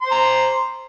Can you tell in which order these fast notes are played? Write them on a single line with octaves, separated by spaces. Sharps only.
C6 C5 A#5